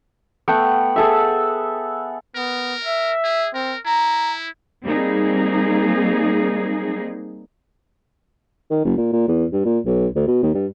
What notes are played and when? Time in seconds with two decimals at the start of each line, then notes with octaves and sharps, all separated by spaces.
0.48 A3 B3 F#5 G5
0.96 G#4 A4 E5
2.36 B3 A#4
2.84 E5
3.24 G#4
3.54 C4 A#4
3.86 E4 A#5
4.83 G3 A#3 C4 D#4 G#4
8.71 D#3
8.85 F#1
8.97 A#2
9.13 A#2
9.28 E2
9.53 G2
9.65 A#2
9.86 B1
10.16 D2
10.27 B2
10.43 D#2
10.54 G2